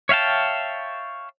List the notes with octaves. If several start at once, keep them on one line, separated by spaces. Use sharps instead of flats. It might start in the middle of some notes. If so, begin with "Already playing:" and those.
C#5 E5 F5 G5 A5